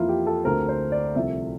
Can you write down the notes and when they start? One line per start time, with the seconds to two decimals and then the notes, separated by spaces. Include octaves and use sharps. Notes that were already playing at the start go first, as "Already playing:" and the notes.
Already playing: F2 E3 A#3 E4 F4
0.09 G4
0.27 A4
0.44 D2 D3 A3 C4 A#4
0.69 C5
0.92 D5
1.15 C2 C3 F3 A3 E5